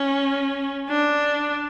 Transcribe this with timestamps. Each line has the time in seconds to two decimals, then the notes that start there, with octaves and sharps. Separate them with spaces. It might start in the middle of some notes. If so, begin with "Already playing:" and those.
Already playing: C#4
0.89 D4